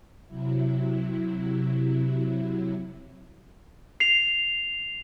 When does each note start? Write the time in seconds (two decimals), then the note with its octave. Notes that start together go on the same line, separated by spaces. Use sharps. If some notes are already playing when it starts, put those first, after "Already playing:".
0.27 C3 F#3 E4
4.00 C7 F7